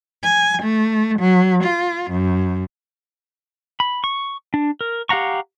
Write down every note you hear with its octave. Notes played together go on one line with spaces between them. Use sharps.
G#5
A3
F#3
F4
F#2
B5
C#6
D4
A#4
G4 F5 F#5 A#5 C#6